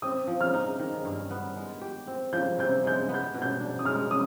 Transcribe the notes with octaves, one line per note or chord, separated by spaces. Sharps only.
C4 D#6
F3
F6
D#4
D#3
G2
B3
G#3
G4
C4
F3 G6
C3 G6
G#3 G6
B3
G6
B2
G6
D4
D#6
G#3 F6
D#6